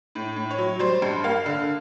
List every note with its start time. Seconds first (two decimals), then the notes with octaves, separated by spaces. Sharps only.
0.15 A2
0.36 A2
0.50 C#5
0.58 F#3
0.79 G3 C5
1.02 G2
1.24 A#3 F5
1.46 D3